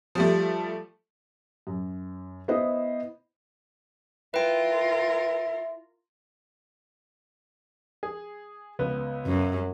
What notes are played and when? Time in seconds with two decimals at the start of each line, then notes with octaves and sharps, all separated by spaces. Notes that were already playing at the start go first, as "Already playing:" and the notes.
0.15 F3 G3 A3
1.67 F#2
2.48 B3 E4 C5 D#5
4.34 E4 F4 A#4 B4 G5
8.03 G#4
8.79 C#2 B3
9.27 F#2